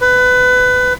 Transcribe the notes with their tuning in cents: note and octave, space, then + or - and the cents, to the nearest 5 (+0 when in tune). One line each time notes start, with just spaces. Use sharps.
B4 +20